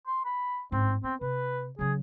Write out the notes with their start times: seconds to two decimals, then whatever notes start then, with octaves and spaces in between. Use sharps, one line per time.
0.07 C6
0.25 B5
0.72 A1 G#2 C4
1.03 B3 C4
1.21 C3 B4
1.79 C#3 F#3 G#4